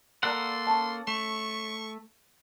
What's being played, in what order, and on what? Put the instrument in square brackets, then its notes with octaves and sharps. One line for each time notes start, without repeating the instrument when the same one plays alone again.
[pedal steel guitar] A#3 A4 F#5 [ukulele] A#4 D5 A#5 [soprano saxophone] C6
[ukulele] C#4 A5
[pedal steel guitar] A3 [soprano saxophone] C#6